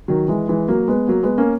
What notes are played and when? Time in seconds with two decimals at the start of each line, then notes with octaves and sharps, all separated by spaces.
0.08 D#3 F#3
0.28 E3 G#3
0.48 E3 G#3
0.68 F#3 A#3
0.88 G#3 B3
1.08 F#3 A#3
1.23 G#3 B3
1.38 A#3 C#4